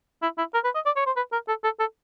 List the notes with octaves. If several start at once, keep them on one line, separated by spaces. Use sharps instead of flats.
E4
E4
A#4
B4
D#5
D5
C#5
C5
B4
A#4
A4
A4
A4